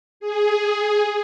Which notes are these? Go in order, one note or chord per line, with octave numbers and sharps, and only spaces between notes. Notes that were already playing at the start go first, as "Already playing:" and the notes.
G#4